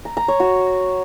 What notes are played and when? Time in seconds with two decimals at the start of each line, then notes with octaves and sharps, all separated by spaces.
0.05 A#5
0.17 A#5
0.28 C#5
0.40 F#4